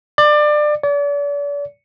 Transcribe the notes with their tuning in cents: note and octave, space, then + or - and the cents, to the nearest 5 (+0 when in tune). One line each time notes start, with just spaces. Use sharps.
D5 +25
D5 -40